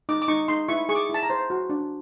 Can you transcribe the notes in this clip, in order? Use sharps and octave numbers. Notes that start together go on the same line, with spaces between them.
D#4 D6
D6
D#4 C#6
D#4 C6
E4 C#6
G#4 C#6
D6
E4 A5
A#5
C5
F#4
D4